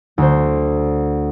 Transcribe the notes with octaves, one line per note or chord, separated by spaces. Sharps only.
D2 C5